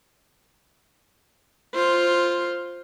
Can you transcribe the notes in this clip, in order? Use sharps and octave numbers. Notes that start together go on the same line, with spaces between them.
F4 C5